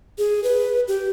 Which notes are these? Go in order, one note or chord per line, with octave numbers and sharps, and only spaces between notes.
G#4
B4
G4